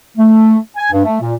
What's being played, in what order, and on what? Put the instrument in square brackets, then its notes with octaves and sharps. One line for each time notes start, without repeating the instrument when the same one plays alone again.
[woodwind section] A3
G#5
G2
A3
A#2